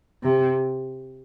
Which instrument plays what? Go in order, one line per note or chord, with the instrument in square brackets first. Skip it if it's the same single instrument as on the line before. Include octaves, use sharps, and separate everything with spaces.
[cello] C3